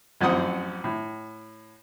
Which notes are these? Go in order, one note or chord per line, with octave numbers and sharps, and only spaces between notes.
A1 F#2 F3 C4 F#5 D#6
A2